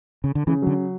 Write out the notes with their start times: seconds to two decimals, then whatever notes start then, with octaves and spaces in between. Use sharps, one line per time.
0.24 C#3
0.35 D3
0.47 C#3 E3
0.62 D3 F#3